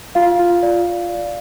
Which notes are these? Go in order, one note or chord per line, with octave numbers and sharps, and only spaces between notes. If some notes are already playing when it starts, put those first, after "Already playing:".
F4 F5
F4
D5